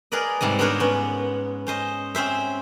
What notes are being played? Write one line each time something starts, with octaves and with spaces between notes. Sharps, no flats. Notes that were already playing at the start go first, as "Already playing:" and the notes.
G#4 A#4 B4 D5 D#5
G#2 C3 G3 D#5
B3 D4 F#4 A#4 C5 C#5
B3 C#4
C#4 C5 D#5
C4 C#4 C5 E5